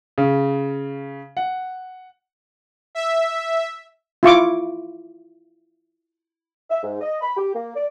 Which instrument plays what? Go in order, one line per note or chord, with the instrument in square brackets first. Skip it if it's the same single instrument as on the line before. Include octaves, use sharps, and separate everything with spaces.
[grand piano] C#3
F#5
[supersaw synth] E5
[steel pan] E4 F4 C#6 D6
[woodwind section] E5
G#2
D#5
B5
G4
A#3
D5